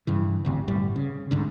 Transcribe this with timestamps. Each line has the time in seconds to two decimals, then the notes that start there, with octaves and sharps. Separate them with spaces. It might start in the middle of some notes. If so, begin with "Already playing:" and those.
0.07 G2 C#3 E3
0.45 G#1 D2 C3
0.68 G1 A2 G3
0.96 C#3
1.31 C2 G#2 D3